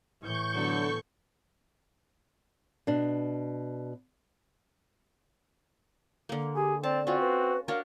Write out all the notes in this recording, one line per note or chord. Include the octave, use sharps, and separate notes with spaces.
A2 E3 C#6 G6
D3 F#3 B3 A4
B2 D4
D3 A#3
G4 G#4
C4 D5 A5
C4 C#4 F4 F#4
B4
D4 F#4 A#4 C#5 F5